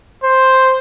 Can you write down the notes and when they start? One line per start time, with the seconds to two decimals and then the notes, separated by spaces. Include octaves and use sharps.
0.24 C5